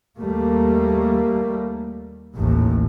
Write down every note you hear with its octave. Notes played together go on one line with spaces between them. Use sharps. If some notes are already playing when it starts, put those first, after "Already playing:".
D#2 G3 A3 A#3
A1 D#2 A2